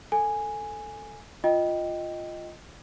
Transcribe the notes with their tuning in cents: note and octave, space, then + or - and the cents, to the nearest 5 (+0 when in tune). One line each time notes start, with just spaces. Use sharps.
A4 +10 G#5 +0
F4 +0 D#5 +0 G5 +0